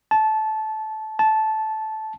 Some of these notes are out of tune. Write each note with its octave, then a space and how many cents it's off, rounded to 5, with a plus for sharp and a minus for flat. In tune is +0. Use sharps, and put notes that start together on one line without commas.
A5 -15
A5 -10